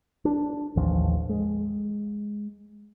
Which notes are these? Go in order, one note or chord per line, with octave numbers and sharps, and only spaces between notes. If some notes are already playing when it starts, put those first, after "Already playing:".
D4
A1 D#2 F3
G#3